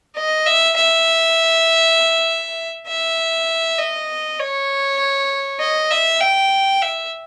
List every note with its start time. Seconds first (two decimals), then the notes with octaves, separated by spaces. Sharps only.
0.16 D#5
0.47 E5
0.77 E5
2.88 E5
3.79 D#5
4.40 C#5
5.60 D#5
5.91 E5
6.20 G5
6.82 E5